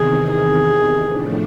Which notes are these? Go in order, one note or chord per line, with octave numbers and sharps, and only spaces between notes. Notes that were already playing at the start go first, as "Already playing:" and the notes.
Already playing: E2 C3 D#3 G#4
G#4
A2 F3 A3 D4